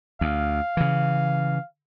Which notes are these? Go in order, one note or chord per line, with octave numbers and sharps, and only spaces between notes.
D2 F5
C#3 E3